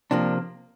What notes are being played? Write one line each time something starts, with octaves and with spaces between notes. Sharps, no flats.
C3 F3 A#3 D4